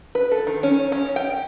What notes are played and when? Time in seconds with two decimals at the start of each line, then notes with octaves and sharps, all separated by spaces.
0.15 B4
0.31 A4
0.47 D#3
0.63 C#4
0.92 C#4
1.16 G5